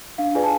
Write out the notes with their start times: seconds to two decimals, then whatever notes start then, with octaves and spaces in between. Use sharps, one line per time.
0.18 D4 F5
0.35 F4 G#4 B4 D5 G#5
0.43 A5